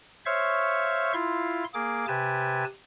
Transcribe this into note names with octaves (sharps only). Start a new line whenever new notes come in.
C5 C#5 E5 F5 C#6
E4 F4 F5 C6
A#3 G#4 D6
C3 G4 B4 G#5 A5